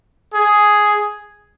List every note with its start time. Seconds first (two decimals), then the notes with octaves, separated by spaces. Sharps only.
0.34 G#4